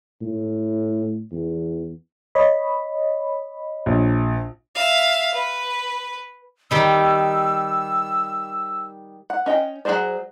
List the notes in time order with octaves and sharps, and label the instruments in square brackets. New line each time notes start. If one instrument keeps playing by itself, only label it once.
[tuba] A2
E2
[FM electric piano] C#5 D#5 B5
[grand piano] A#1
[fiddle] E5 F5
B4
[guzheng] D#3 G3 D#4 [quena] E6
[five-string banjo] F#5
C#4 D#5 F#5 G5
F#3 D4 G#4 C5 D5